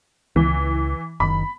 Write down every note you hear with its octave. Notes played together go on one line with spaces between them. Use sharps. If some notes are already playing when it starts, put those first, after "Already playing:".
C#2 E3
F#1 D#3 B5